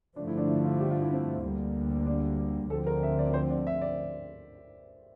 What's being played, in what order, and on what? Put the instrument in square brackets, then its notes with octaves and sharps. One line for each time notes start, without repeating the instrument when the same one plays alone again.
[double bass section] G2 D3 F3 A3 [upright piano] D4
[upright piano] E4
D4
E4
F4
G4
F4
E4
C4
[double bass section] D2 D3 G3 A#3
[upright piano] D4
[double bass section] D2 D3 F3 C4 [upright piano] A4
[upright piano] A#4
E5
D5
C5
D5
E5
D5